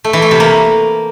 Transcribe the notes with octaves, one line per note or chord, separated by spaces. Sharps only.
A3
E3
A3
C3
A#3